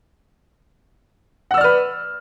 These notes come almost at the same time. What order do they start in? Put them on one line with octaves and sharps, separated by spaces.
F#5 E6 D5 F6 B4